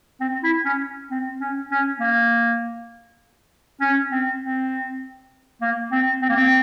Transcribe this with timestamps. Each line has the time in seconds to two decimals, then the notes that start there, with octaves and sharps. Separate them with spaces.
0.21 C4
0.43 E4
0.65 C#4
1.11 C4
1.41 C#4
1.71 C#4
2.00 A#3
3.81 C#4
4.12 C4
4.42 C4
5.61 A#3
5.92 C4
6.22 C4
6.30 A#3
6.36 C4